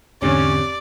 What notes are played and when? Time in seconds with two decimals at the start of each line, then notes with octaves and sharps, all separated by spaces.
0.22 E2 G#2 D3 C4 C#4 G4 C#5 D5